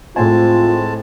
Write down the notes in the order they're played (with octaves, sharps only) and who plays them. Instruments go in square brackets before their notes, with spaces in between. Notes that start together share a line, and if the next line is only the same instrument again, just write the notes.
[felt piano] A2 C5 G#5 [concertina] G#3 A5 [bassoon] C4 [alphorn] F4